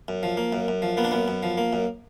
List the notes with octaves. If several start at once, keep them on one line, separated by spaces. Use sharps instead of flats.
F#2
F3
A#3
F#2
F#2
F3
A#3 B3
D4
F#2 B3
F#2
F3
A#3
F#2